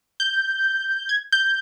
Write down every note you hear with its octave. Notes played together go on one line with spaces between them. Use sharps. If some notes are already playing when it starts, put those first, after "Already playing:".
G6
G#6
G6